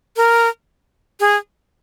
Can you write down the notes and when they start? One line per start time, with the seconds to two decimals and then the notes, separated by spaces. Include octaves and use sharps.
0.17 A#4
1.20 G#4